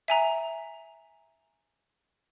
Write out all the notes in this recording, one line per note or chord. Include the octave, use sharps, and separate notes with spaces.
E5 G#5 A#5